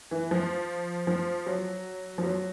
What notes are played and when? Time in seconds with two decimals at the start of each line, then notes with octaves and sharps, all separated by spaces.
0.11 E3
0.31 F3
1.07 F3
1.46 F#3
2.18 F3
2.23 F#3